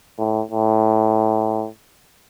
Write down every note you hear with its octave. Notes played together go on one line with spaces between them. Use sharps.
A2
A2